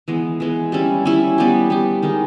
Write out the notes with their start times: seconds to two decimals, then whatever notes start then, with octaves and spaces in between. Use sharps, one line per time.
0.08 E3 G#3 B3
0.40 E3 G#3 B3
0.72 G3 C#4 E4
1.05 G3 C#4 E4
1.38 G3 B3 G4
1.70 G3 B3 G4
2.03 D#3 G#3 D#4